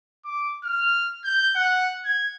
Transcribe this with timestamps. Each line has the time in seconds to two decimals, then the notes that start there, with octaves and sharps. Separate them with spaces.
0.25 D6
0.64 F6
1.24 G6
1.55 F#5
2.05 G#6